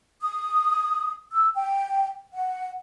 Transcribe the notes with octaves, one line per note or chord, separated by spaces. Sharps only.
D#6
E6
G5
F#5